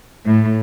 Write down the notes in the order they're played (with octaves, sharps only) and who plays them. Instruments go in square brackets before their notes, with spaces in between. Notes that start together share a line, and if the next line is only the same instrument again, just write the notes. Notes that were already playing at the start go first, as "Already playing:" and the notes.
[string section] A2